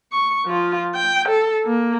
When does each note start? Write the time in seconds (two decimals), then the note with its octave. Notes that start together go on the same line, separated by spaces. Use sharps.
0.13 C#6
0.46 F3 F4
0.95 G5
1.29 A4
1.65 A#3